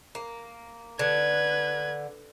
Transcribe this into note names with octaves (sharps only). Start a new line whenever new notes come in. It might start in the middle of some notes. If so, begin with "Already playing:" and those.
A#3
D3 B4 G#6